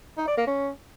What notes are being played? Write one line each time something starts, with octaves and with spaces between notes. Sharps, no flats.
D#4
D5
A#3
C#4